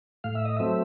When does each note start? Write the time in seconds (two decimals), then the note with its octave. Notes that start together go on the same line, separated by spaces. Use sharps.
0.24 A2 F5
0.35 E5
0.45 D#5
0.57 F#3 A3 C4 E5